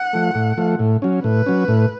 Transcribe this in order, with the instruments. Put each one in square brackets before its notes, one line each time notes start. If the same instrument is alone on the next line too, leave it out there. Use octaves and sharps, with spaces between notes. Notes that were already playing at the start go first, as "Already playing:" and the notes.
Already playing: [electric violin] F#5
[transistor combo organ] F3 A3
A2
F3 A3
A2
F#3 C#4
[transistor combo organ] A2 [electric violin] B4
[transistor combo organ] F#3 C#4
A2